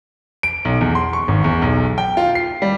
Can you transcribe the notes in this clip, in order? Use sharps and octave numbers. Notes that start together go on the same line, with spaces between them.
D7
B1
E2
C6
C#6
G#1
E2
B1
G5
F4
C7
G3